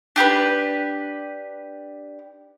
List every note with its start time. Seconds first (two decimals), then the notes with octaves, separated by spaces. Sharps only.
0.16 D4 G4 A4 B4